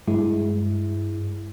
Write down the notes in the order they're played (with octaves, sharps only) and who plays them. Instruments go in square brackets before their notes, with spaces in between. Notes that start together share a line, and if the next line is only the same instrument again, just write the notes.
[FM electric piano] G2 G#3 E4